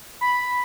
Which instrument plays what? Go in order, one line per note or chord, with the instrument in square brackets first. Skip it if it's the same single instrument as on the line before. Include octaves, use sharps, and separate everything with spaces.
[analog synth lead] B5